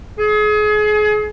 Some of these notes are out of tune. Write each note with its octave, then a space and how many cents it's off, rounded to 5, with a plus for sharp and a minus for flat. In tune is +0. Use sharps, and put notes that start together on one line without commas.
G#4 +30